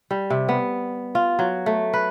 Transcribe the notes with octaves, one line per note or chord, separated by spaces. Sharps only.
G3
C3
B3
F4
F#3
A3
B4